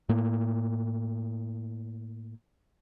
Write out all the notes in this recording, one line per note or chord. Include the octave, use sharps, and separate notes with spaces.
A2 A#3